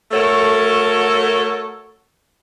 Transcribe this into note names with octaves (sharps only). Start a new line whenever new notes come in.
A3 F#4 A4 A#4 C#5